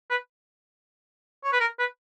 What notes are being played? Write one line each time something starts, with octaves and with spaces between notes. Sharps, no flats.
B4
C#5
B4
A#4
B4